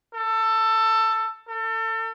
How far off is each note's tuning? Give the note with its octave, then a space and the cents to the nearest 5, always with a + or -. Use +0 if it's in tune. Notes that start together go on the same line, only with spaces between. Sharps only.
A4 +15
A4 +35